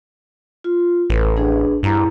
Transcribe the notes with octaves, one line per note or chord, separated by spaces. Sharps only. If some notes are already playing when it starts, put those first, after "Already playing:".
F4
A1 A4 B4
D4 G#4 B4
G2 E4 A#5